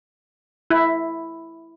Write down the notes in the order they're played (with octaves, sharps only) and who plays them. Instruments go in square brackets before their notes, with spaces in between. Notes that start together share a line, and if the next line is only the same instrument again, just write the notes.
[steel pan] E4